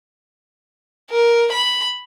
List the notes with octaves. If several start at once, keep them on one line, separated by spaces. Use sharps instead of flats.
A#4
B5